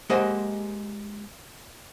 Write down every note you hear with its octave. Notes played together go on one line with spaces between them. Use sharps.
G#3 A#3 G4 C5 D#5 F#5